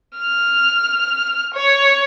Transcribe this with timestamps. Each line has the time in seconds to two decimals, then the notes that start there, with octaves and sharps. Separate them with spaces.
0.18 F6
1.54 C#5